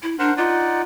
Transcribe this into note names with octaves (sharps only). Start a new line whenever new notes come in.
E4
D4 A#4 C5 F#5
D#4 F4 D5 F#5